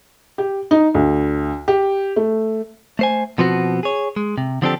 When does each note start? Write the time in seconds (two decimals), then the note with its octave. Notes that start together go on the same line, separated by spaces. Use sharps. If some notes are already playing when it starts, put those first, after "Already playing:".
0.38 G4
0.71 D#4
0.94 D2
1.68 G4
2.16 A3
2.99 A3 C5 G#5
3.38 B2 F3 B3 C4 F#4
3.83 G#4 C#5
4.16 G#3
4.38 C3
4.62 D3 F3 C4 D4 G4 A4